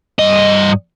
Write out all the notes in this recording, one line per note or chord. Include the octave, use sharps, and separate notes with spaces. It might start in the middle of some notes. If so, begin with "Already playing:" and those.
G2 D#5